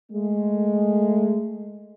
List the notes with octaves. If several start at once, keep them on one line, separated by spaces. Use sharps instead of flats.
G#3 A3